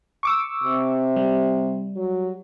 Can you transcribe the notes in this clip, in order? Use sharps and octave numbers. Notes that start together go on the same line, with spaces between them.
C#6 D6 E6
C3
G3
F#3